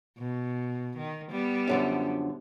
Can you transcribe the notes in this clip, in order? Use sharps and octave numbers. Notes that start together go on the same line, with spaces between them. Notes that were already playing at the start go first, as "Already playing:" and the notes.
B2
D#3
G3 B3
F#2 D3 F3